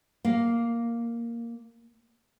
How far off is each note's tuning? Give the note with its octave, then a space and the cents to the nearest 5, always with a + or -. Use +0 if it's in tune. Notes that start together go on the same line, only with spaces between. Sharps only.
A#3 +0 F5 +0